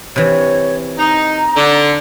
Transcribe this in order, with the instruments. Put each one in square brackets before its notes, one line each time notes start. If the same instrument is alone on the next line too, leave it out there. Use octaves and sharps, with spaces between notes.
[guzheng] C3 E3 [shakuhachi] C#5
[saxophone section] D#4 [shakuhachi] A#5
[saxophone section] D3